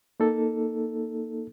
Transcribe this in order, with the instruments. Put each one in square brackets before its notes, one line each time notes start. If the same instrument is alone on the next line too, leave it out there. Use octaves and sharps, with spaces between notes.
[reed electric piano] A#3 D#4 A4